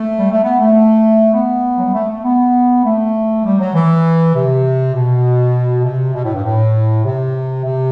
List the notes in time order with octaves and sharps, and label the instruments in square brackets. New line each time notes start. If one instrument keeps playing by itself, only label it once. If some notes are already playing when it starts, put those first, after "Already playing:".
Already playing: [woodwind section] A3
G3
A3
B3
A3
B3
F#3
G3
A3
A3
B3
A3
G3
F#3
E3
C3
B2
C3
B2
A2
G2
A2
C3
C3